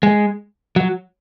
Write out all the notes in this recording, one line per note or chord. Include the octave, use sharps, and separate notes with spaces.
G#3
F#3